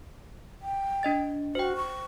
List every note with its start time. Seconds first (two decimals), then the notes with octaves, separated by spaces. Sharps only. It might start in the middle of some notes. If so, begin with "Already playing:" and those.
0.62 G5
1.03 D4 D#5 A6
1.55 F#4 C5 G5
1.76 C#6